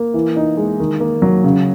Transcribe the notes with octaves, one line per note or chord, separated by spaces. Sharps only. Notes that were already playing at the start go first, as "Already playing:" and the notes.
Already playing: A#3
E3
D#4
G#3
D#3
A#3
F#3
C#3